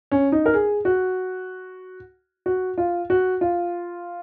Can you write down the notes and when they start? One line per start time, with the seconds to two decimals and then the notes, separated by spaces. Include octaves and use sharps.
0.12 C#4
0.32 D#4
0.46 A#4
0.54 G#4
0.85 F#4
2.46 F#4
2.78 F4
3.10 F#4
3.41 F4